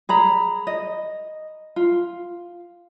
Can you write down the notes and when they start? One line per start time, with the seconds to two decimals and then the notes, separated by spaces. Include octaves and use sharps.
0.09 G#4 A#5 B5
0.67 D#5
1.76 F4